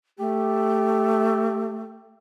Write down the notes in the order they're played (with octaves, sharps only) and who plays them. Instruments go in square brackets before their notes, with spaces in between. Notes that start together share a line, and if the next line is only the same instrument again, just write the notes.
[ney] A3 [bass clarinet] G4